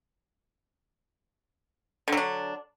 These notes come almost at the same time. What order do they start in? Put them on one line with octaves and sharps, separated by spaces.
D3 F#3 D4